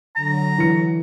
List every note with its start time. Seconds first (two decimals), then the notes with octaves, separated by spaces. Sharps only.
0.16 D3 F#3 A#5
0.58 E3 C#7